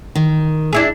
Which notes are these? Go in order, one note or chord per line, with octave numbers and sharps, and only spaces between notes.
D#3
D4 E4 G#4